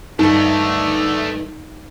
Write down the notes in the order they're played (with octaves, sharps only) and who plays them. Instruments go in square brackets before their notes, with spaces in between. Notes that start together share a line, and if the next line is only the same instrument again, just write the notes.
[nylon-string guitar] G2 D#3 [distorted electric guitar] A3 D4 [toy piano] D#4